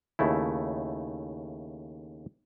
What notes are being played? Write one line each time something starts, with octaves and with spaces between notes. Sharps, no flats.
D#2 C#3 A3 E4